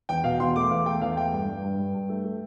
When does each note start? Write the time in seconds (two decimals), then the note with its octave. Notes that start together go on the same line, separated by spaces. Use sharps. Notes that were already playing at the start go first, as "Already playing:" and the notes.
0.09 E2 G5
0.24 B2 F5
0.40 E2 C6
0.56 A3 D6
0.70 E2 F5
0.86 A3 G5
1.01 E2 F5
1.17 A3 G5
1.33 G2
1.48 G2
1.63 G2
1.79 G2
1.94 G2
2.09 A3
2.25 A3